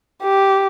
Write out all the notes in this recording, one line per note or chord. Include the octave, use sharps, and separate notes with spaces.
G4